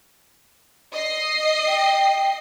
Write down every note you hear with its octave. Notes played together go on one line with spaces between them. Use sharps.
D#5 C7
G5